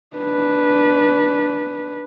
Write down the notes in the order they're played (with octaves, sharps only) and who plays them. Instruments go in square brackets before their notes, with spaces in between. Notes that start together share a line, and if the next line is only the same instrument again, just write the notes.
[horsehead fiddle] D4 B4